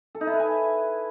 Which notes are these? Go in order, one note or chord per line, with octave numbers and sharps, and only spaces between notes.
A4
D#4
E4
B4
G#5